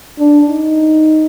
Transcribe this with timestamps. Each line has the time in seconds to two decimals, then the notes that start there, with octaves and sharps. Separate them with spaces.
0.19 D4
0.48 D#4